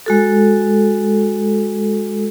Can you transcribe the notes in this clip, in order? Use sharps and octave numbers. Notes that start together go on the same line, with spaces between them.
G#3 F#4 A4